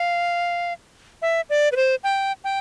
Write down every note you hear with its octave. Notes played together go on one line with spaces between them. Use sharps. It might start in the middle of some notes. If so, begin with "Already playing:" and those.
Already playing: F5
E5
D5
B4
C5
G5
G5